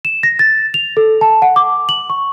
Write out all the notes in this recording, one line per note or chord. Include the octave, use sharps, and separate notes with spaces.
E7
A#6
A6
F7
A4
A5
F#5
D6
F#7
C#6